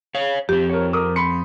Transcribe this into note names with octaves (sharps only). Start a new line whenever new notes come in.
C#5 F5
F2 C4 G4
A#4 C#5
A#4 D6 D#6
B5 C6 C#7